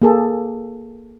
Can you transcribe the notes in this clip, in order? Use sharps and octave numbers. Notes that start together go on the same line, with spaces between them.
A#3 G#4 A4